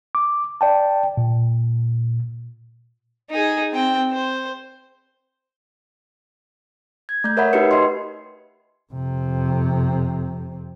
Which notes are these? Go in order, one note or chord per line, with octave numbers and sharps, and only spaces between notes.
D6
D5 G5 A5
A#2
D#4 G#4
C4 G5
C5
G#6
A3 G6
A#4 C#5 E5 F#5 B5
D#4 F#4 G4 B4 C#7
F#4 B4 D#5 C6
F2 C3